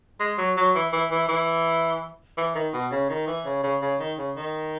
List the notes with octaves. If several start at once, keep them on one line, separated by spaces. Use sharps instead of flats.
G#3
F#3
F#3
E3
E3
E3
E3
E3
D#3
B2
C#3
D#3
E3
C#3
C#3
C#3
D#3
C#3
D#3